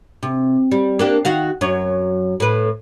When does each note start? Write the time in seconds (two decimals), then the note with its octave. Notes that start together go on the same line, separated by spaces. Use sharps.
0.23 C3
0.71 G3
0.99 A#3 D4 G4
1.25 D#3 F#4 F5
1.61 F#2 F#3 C#5
2.40 A2 B4